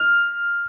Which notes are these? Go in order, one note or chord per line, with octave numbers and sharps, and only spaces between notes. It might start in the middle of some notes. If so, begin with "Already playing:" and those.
Already playing: F6